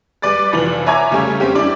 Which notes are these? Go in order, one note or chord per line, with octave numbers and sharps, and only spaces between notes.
G3 B4 D5 D6 A6
F1 E3 F3 F#7
C#5 E5 G#5 A#5 D6 G#6
C#3 G3 A3 C#4
G3 C4 C#4 G4
D4 E4 D5